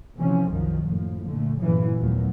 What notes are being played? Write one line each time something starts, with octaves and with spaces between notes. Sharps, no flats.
C3 E3 F3 C4 C#4
C2 F#2 D#3 F3 F#3
F#1 A2 F3
A#2 D3 A3
G1 A#2 C#3 E3 F#3
F1 D#2 A#2 D#3 F#3 B3